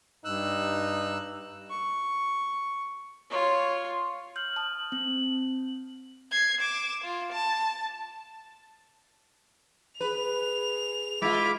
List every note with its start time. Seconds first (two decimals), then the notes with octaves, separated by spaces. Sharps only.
0.25 G2 D#4 E6 F#6
1.70 C#6
3.30 F4 C#5
4.36 F6 G6 F#7
4.56 A5 D#6
4.92 C4
6.32 G#6 C7
6.61 D6 E7
7.04 F4
7.33 A5
10.01 G#4 B4 F7
11.22 G#3 E4 F4 E5 D6